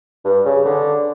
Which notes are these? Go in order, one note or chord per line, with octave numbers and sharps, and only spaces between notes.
G2
C#3
D3